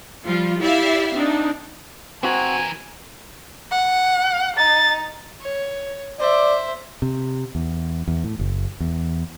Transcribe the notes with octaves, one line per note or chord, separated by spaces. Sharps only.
F3 G3 F4
E4 G4 D5 E5 F5
C4 D4 D#4
E3 C4 F#4 A#4 G#5
F#5
D#4 A6
C#5
C5 D5 E5
C3
E2
E2
A2
F#1
E2